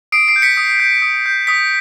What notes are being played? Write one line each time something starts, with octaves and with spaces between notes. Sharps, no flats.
D#6 C7 D7
C7 D7
G6
B6 C#7
D#6
G6
D#6
G6
D#6 B6